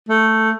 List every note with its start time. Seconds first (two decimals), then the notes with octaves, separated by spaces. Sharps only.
0.09 A3